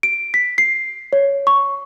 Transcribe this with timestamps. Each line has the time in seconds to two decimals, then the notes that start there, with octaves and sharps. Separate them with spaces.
0.03 D7
0.34 B6
0.58 C7
1.13 C#5
1.47 C#6